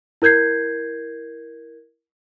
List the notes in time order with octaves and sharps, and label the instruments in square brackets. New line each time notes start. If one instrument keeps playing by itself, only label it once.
[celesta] E4 A#4 G6 G#6 C7